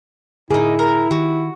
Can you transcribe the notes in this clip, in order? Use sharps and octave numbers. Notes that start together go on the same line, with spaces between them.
A2 D3 A#3 D#4 E4 G#4
A#4
D#3 F#4 G4